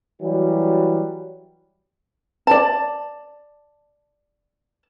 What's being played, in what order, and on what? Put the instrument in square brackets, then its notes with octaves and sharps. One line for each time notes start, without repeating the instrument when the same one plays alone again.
[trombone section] E3 F#3 G3 [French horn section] F#4
[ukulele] D5 A5